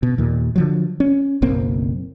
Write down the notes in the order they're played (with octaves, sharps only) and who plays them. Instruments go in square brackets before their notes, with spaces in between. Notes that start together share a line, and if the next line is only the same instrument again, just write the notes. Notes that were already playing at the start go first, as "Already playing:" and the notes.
[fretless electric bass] B2
D#2 A#2
D3 F3 F#3
C#4
F#1 B1 A#3 C4